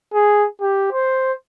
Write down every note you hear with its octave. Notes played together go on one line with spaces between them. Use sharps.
G#4
G4
C5